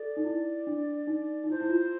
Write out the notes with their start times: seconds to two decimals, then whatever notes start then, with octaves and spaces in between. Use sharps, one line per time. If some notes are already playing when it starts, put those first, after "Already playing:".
Already playing: A4 D5
0.17 D#4
0.24 E4
0.67 D4
1.07 D#4
1.44 D#4
1.50 E4 C5
1.61 E4
1.69 F4